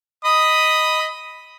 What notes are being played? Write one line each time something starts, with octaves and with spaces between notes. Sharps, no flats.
D#5 B5 D#6